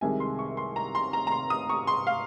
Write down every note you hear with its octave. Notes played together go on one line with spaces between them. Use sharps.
C2 C3 D#3 G#3 G#5
C6
C#6
C6
A#5
C6
A#5
A#5
C6
D#6
C#6
C6
F5